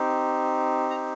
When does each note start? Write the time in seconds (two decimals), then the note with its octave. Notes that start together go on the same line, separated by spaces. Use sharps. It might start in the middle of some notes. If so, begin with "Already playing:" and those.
Already playing: C4 D#4 G4
0.90 A#5